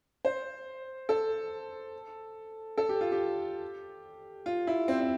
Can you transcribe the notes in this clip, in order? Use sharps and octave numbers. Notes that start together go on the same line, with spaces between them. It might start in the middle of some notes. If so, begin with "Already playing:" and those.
C5
A4
A4
G4
F4
G4
F4
E4
C4
C4